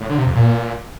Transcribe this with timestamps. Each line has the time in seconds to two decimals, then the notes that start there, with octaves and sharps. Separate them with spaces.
0.01 A2
0.09 D3
0.18 C3
0.27 F2
0.35 A#2